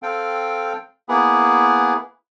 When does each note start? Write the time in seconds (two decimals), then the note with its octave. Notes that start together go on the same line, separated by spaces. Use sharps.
0.03 C4 A4 F5 G5
1.09 A#3 B3 E4 G#4